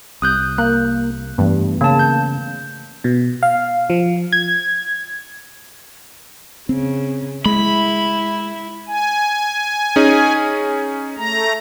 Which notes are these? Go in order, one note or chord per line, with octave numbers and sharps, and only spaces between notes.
C2 C3 D#6 F#6 G6
A#3 F#6
G2 E3 A3 B3
C#3 A#3 A5
G6
B2
F5
F3
G#6
C#3 C4
G#3 E4 B5
G#5
C#4 D#4 G#4
A3 A#5